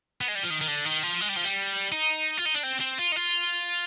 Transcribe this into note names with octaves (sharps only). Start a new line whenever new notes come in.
B3
G#3
G3
F3
D#3
D#3
D3
D#3
F3
G#3
G3
F3
G3
D#4
F4
D#4
D4
C4
C4
F4
D#4
F4